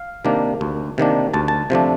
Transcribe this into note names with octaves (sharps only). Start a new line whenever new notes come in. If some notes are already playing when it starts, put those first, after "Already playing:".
Already playing: F5
C3 D#3 A#3 D4
D2
C3 D#3 A#3 D4
D2 A5
A5
C3 F3 A3 D4